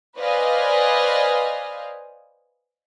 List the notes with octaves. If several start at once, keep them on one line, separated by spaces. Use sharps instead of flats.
B4 C5 D5 D#5 F5 G#5